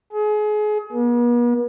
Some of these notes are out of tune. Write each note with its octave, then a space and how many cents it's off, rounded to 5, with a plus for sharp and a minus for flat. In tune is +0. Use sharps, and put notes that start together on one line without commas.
G#4 +30
B3 -45